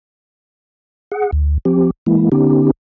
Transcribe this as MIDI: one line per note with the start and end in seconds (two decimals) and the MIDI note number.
1.12 1.31 68
1.12 1.31 78
1.32 1.58 38
1.65 1.91 53
1.65 1.91 60
1.65 1.91 67
2.06 2.29 52
2.06 2.29 56
2.06 2.29 58
2.06 2.29 64
2.32 2.71 50
2.32 2.71 59
2.32 2.71 61
2.32 2.71 63
2.32 2.71 67